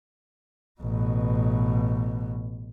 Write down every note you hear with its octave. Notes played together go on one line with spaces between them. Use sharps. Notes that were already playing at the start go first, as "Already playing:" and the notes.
A1 B2